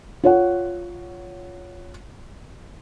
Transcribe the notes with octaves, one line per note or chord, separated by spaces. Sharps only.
F4 C#5 F#5